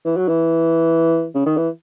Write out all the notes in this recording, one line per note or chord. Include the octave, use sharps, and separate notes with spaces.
E3
F#3
E3
C#3
D#3
E3